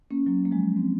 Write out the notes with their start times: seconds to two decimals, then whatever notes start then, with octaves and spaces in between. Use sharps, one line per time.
0.11 A#3 C#4
0.26 F#3 A#3
0.45 A#3
0.51 F3 G#3
0.76 G#3 C4